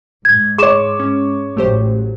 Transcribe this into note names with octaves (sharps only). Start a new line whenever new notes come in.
G#2 G#6
G#4 C#5 C6 D6 E7
C#4
A1 F#3 A3 G4 C5